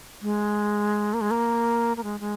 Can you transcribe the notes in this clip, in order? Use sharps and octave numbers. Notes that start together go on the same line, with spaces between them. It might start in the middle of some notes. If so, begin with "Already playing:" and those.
G#3
A#3
G#3
A#3
A#3
G#3
G#3